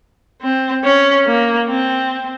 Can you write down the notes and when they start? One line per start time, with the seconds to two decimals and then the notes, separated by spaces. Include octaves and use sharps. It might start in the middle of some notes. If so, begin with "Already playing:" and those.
0.42 C4
0.84 C#4
1.26 A#3
1.68 C4